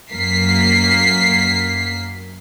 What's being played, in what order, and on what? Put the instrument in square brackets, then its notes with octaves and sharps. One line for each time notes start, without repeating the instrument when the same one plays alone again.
[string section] F#2 A#3 B6 C7